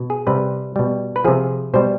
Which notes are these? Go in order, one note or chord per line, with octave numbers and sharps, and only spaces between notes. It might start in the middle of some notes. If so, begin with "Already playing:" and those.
Already playing: B2
G#4
C3 G3 B4
B2 G3
B4
C3 F3 G#4
B2 G3 C5